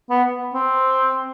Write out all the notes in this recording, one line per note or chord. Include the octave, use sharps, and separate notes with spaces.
B3
C4